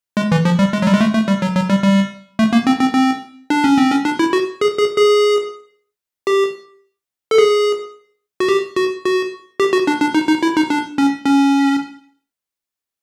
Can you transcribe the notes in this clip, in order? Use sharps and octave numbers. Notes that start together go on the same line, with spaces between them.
G#3
E3
F3
G3
G#3
F#3
G3
G#3
A3
A3
G3
F#3
F#3
G3
G3
A3
A#3
C4
C4
C4
D4
C#4
C4
C#4
D4
E4
F#4
G#4
G#4
G#4
G4
A4
G#4
F#4
G4
F#4
F#4
G4
F#4
D4
D4
D#4
D#4
E4
D#4
D4
C#4
C#4